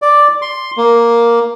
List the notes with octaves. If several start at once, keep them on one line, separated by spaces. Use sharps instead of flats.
D5
C6
A#3